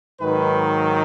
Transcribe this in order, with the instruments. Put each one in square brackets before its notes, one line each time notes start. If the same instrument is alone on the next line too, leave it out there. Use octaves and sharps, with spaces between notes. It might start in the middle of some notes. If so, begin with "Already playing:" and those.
[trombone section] G#2 D#3 F#3 B4